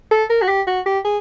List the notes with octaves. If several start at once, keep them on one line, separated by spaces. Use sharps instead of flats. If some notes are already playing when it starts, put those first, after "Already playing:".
A4
A#4
F#4
G4
F#4
G4
G#4